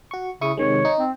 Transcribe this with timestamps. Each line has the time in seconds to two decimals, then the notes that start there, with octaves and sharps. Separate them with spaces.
0.11 F#4 C#6
0.41 C#3 E4 C#6 D#6
0.57 C3 D#3 G#3 C#5
0.85 D#4
0.98 C4